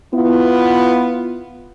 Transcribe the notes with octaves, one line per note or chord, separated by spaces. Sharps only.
B3 E4 F4